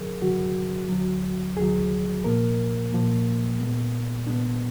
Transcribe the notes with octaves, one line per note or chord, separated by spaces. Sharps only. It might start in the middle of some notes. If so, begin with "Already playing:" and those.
Already playing: F#2 D3 F#3 G#4 A#4
F#2 D3 F#3 F#4
D2 D3 F#3
D2 D3 F#3 G#4
A#2 F3 A#3 A#4
A#2 F3 A#3
A#2 G#3 B3
A#2 G#3 B3 D4